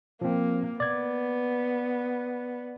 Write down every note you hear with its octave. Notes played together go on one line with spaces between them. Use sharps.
F3 A#3 C4
B3 D5 G#6